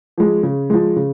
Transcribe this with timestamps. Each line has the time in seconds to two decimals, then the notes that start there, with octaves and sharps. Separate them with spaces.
0.18 F3 G#3
0.43 C#3
0.70 F3 G#3
0.96 C#3